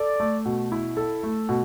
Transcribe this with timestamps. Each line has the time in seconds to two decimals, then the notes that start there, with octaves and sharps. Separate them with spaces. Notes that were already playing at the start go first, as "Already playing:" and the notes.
Already playing: A4 D5
0.20 A3
0.45 B2
0.72 E4
0.97 A4
1.23 A3
1.49 B2